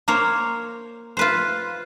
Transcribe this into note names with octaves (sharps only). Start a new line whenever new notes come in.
A#3 A#4 C5 C#5
F4 B4 C5